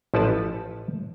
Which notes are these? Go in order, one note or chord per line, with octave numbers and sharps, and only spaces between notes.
A1 F3 E4 A4 B4 A5